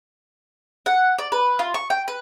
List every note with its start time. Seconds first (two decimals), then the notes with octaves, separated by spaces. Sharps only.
0.86 F#5
1.18 D5
1.32 B4
1.59 F4
1.74 C#6
1.90 G5
2.08 B4